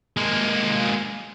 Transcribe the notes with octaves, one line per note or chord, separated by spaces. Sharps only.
G#3 A#3